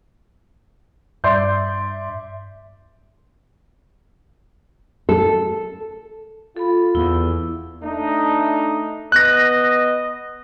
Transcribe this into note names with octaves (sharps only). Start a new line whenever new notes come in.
G2 D5 E5 C6 G6
A4
F4 A4 B5
E2 E4 E6
A3 D4 D#4
B3 D#5 F#6 A#6